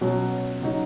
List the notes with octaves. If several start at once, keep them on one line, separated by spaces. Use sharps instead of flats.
B2 F#3 C#4
C#3 F#3 D#4